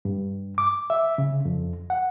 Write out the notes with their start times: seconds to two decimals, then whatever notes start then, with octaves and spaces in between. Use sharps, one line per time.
0.05 G2
0.58 D6
0.90 E5
1.18 C#3
1.45 F2
1.90 F#5